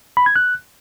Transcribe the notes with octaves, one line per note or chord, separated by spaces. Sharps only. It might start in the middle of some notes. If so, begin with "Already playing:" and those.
B5
G#6
F#6